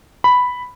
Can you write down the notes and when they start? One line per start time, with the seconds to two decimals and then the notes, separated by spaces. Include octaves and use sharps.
0.24 B5